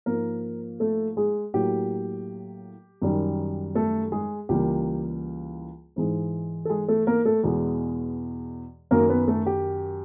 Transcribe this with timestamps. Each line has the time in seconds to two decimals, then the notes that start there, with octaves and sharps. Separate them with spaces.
0.06 G#2 F3 A#3 A#4
0.80 A3 A4
1.17 G#3 G#4
1.54 A2 F#3 A#3 G4
3.02 F#2 D#3 G3
3.75 A3 A4
4.12 G#3 G#4
4.49 C#2 C#3 E3 G3 A#3 G4
5.96 G#2 E3 G#3
6.65 A4
6.70 G#3 G#4
6.88 A3 A4
7.07 A#3 A#4
7.25 A3 A4
7.44 E2 B2 G#3
8.91 F#2 D#3 F#3 A#3 A#4
9.09 B3 B4
9.28 A3 A4
9.46 G4